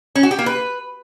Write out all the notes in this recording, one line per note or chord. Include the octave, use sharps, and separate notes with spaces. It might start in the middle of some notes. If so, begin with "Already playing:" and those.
C#4
F#4
G4
A#3
B4